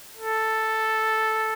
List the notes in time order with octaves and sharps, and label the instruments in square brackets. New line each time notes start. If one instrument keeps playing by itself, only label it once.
[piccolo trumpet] A4